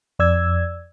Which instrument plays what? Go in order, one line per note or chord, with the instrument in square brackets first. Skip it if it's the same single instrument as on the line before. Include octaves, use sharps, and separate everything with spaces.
[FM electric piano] F2 D5 E6 G#6